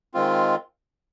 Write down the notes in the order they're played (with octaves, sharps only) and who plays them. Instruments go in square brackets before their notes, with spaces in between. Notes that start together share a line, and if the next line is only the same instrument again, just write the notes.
[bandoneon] D#3 G#3 C4 F4